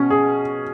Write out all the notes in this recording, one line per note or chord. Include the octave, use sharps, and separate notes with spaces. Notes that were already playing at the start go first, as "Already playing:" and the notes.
Already playing: B2 C#4
G#4